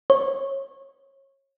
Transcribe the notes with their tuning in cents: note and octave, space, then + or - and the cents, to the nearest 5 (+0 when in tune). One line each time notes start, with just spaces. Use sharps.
C#5 -25